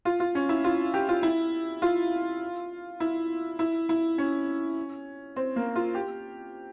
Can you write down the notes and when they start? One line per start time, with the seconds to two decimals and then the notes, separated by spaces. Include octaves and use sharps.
0.05 F4
0.20 F4
0.35 C#4
0.49 E4
0.64 F4
0.94 G4
1.09 F4
1.23 E4
1.82 F4
3.00 E4
3.59 E4
3.89 E4
4.18 C#4
5.36 C4
5.56 A#3
5.76 F4
5.95 G4